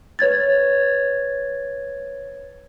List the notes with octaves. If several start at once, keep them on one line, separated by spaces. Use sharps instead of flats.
B4 C#5 G#6 A6